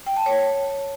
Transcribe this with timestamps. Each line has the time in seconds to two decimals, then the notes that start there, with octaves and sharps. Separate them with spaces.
0.06 G5
0.16 A5
0.26 C#5